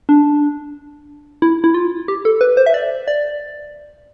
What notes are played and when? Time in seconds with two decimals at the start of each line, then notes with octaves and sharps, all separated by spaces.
0.09 D4
1.42 E4
1.64 E4
1.74 F4
2.08 G4
2.25 A4
2.41 B4
2.57 C5
2.66 E5
2.74 D5
3.08 D5